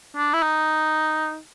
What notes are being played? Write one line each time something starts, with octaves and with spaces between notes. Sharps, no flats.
D4
E4
D#4